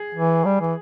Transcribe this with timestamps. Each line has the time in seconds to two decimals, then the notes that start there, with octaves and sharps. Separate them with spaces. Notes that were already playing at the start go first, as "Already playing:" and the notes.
Already playing: G#4
0.14 E3
0.45 G3
0.60 E3